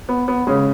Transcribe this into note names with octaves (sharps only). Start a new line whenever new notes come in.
B3
B3
C#3 G#3 C#4